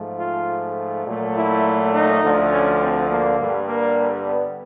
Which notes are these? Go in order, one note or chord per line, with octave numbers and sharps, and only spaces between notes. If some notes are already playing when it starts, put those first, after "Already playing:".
Already playing: G#2 F3 A3
F4
A#2 F#3 A3
E4
D#4
D2 D3 F3 A3
C#4
C4
A#3
G2 D3 G3
A#3
B3